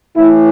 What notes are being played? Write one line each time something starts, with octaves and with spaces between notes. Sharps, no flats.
A2 E3 E4